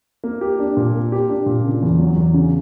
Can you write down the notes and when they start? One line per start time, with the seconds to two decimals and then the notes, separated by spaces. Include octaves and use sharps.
0.24 A#3
0.41 G4
0.59 D4
0.77 A#2
0.94 A#3
1.12 G4
1.30 D4
1.46 A#2
1.64 C#3
1.82 E2
2.00 F#3
2.16 E2
2.34 C#3